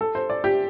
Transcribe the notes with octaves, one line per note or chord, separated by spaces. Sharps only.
A4
C5
D5
G4